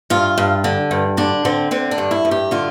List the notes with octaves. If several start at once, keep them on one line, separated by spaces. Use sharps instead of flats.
G2 F4
G2
D3
G2
D3 D4
D3 C4
D3 C4
D4
G2
E4
G2
G4
D3 F4